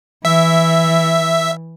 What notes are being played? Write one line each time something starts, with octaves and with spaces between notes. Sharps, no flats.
E3 E5